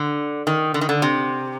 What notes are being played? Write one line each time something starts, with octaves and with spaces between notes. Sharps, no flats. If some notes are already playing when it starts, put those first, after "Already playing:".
Already playing: D3
D#3
D3
D#3
D3
C3